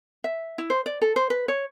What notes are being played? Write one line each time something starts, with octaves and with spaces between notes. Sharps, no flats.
E5
E4
C5
D5
A4
C5
B4
C#5